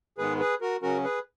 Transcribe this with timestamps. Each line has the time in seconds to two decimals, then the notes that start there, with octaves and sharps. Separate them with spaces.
0.18 G#2 D#3 G#3 B3 G#4 B4
0.40 G#4 B4
0.61 F#4 A#4
0.82 C#3 F#3 C#4 F#4 A#4
1.04 G#4 B4